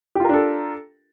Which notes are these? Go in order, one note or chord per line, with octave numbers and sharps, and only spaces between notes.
D4 F4 G4 A4 A#4